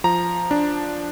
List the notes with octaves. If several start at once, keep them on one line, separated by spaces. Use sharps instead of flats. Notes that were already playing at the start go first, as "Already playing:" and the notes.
F3 A#5
D4